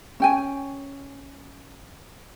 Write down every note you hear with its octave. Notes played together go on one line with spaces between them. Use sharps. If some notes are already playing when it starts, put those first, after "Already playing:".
C#4 G5 G#5